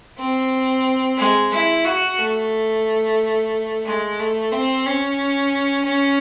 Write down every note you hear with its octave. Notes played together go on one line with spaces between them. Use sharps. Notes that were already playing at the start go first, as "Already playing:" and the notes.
C4
G#3
E4
F#4
A3
G#3
A3
C4
C#4
C#4